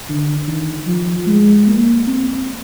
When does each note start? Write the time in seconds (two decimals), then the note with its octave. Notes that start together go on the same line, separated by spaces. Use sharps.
0.09 D3
0.47 D#3
0.87 F3
1.27 G#3
1.68 A#3
2.07 C4